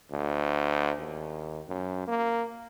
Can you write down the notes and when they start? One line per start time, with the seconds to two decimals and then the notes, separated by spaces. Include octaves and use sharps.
0.11 D2
0.99 D#2
1.68 F#2
2.07 A#3